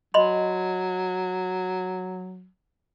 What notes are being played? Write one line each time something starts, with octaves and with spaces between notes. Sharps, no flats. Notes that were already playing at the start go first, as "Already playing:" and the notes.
F#3 D#5 B5 C6